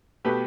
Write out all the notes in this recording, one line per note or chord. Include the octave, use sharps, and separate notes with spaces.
B2 A3 G4 B4